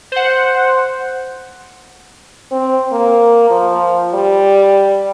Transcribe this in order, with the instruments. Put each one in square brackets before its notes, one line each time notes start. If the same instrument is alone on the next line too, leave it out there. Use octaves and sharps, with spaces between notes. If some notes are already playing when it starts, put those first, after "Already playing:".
[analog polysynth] C5 F#5
[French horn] C4
A#3
F3
G3